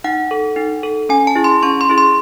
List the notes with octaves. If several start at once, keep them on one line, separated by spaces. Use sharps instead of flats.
D#4 F#5
A4
D#4
A4
C#4 G#5
A5
E4 G#4
C6
C#4 C#6
C6
E4 G#4
C6